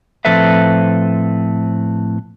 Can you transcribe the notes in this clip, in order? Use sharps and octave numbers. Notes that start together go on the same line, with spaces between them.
A2 F3 C4 A4 B4 E5